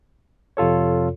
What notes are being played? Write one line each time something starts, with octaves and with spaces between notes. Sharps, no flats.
F2 C3 F4 A4 C#5